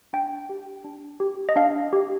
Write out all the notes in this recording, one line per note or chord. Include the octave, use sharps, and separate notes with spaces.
D4 G5
G4
D4
G4
D#5
D4 F5
G4